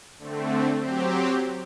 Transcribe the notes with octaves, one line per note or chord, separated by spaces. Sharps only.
D3 A3 C4
F#3 C4 G4